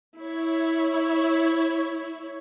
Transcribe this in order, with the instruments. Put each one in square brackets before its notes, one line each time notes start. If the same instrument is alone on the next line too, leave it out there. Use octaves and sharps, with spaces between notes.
[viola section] E4 C#5